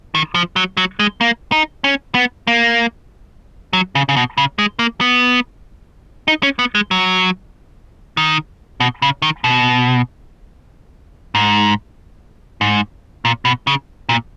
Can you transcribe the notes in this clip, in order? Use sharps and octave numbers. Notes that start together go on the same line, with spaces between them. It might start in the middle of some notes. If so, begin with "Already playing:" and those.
D#3
F3
F#3
F#3
G#3
A#3
D#4
C#4
B3
A#3
F#3
C#3
C#3
B2
C#3
G#3
A#3
B3
D#4
C#4
B3
G#3
F#3
D#3
B2
C#3
D#3
B2
G#2
G#2
A#2
B2
C#3
A#2